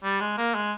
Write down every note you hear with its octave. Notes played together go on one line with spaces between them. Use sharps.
G3
G#3
A#3
G#3